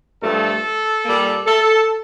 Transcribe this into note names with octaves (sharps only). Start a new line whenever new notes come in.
G2 F3 A3 A4
A#2 G3 A#3
A4